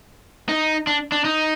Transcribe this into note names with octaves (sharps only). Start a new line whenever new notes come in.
D#4
D4
D4
D#4